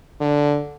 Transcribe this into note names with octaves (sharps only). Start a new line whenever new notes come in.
D3